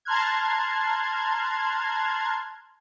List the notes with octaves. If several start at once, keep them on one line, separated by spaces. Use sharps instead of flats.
A5 A#5 C6 F6 F#6 G#6